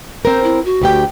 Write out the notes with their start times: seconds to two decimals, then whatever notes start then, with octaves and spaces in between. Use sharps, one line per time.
0.25 C4 A#4 C5
0.43 E4
0.65 F#4
0.82 D2 G4 G5